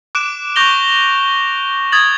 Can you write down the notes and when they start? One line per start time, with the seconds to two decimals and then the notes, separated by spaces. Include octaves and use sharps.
0.15 D6 F#6 D7 E7
0.56 C#6 D6 G6 A#6 F7 G7
1.92 D#6 G#6 A6 F#7